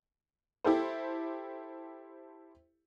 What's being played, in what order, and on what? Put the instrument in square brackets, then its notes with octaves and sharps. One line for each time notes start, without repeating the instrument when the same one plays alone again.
[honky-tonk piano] E4 G4 A4 C5